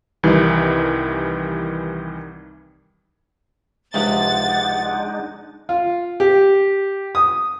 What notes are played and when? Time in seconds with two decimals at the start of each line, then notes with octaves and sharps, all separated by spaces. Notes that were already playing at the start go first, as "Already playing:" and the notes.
0.23 C2 D#3 E3 G3
3.94 C#2 C3 F3 G#3 D4 D#4 F#5 A6
5.69 F4
6.20 G4
7.15 D#6